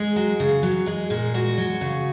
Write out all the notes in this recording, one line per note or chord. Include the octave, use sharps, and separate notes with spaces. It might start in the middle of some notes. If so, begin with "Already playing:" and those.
Already playing: G#3 G#4
F#3
C#3
F#3
G#3 G#4
A#2 G#4
G#3 F#4
F#3
C#3